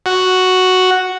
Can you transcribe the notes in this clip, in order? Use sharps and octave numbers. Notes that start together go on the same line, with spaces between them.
F#4